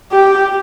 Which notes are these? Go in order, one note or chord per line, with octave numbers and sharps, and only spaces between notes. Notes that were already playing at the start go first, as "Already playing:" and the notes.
G4